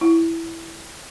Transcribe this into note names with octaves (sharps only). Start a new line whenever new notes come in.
E4